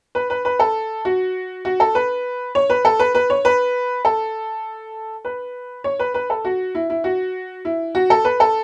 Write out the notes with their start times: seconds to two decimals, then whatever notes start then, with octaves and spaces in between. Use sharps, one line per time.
0.15 B4
0.30 B4
0.45 B4
0.59 A4
1.05 F#4
1.65 F#4
1.80 A4
1.95 B4
2.55 C#5
2.70 B4
2.85 A4
2.99 B4
3.15 B4
3.30 C#5
3.45 B4
4.05 A4
5.25 B4
5.84 C#5
5.99 B4
6.14 B4
6.30 A4
6.45 F#4
6.75 E4
6.90 E4
7.04 F#4
7.65 E4
7.95 F#4
8.10 A4
8.25 B4
8.40 A4